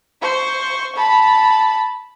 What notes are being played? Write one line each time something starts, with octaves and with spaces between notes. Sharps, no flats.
C5 C#6
A5 B5